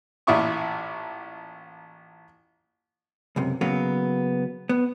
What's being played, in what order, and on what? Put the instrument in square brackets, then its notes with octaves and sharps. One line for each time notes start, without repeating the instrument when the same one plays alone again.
[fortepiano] A1 A#2 E4 D5 C#6 D#6
[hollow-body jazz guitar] C#2 F#2 C3
C#3 F#3 A#3 B3
B3